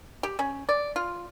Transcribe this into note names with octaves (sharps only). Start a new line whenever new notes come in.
G4
C#4
D5
F4